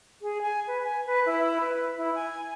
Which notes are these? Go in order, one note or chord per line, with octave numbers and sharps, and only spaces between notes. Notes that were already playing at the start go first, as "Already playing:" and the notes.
G#4
G#5
B4
G#5
B4
E4
B4
E4
G#5